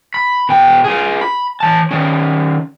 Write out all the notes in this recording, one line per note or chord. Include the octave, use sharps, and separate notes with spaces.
B5
B2 G5
F4 G#4
B5
E3 A5
D#3 C#4